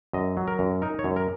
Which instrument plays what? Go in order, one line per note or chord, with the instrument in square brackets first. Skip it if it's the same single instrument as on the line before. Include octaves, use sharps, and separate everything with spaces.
[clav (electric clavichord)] F#2 D#5
F#3
A#4
F#2
D#4 A#4
C#5
F#2
A#4